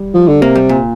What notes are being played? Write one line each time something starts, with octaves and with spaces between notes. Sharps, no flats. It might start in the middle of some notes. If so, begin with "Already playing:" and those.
Already playing: G3
F3
D3
C3 A#3
G3
A#2